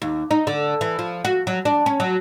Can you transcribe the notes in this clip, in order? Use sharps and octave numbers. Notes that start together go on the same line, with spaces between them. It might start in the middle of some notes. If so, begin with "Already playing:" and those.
D#2
D#4
D3
E3
F3
F#4
F#3
D4
C#4
F#3